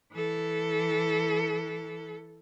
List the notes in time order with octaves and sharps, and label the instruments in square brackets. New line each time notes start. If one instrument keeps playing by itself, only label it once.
[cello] E3 A4